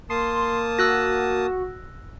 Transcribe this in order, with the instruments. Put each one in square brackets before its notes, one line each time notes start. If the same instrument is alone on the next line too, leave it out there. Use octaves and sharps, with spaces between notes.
[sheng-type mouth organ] A#3 A5 D#6 [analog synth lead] C6
[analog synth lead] F#4 [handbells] E6 F#6 A#6